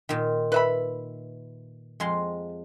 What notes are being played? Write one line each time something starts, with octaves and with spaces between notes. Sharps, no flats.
A#2 D#3
B4 E5 B5
F2 G#3 C6